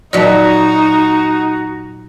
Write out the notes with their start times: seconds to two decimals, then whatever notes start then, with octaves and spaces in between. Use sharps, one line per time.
0.13 A#2 F#3 D#4 F#4 D5 D#5 A5